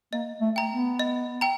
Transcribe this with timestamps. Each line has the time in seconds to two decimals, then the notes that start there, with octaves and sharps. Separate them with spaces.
0.13 A#3 D#5
0.41 A3
0.56 G5 A#5
0.70 B3
0.99 D#5
1.41 G5 A#5